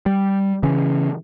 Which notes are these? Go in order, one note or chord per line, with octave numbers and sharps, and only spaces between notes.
G3
C#3 E3 C#4